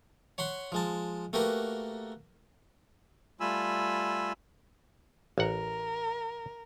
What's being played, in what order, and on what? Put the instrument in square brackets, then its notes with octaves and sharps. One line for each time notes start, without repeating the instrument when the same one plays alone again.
[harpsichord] C#5 F#5 B5 C6
F3 G#3 A5
A3 A#3 F#4 G4 A#4 B4
[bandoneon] G3 A3 F4 G#5 B5 E6
[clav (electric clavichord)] A1 F#5 [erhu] A#4